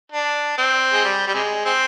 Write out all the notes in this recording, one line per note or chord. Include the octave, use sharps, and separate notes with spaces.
D4
C4
G#3
G3
G3
C3 G#3
G#3 C4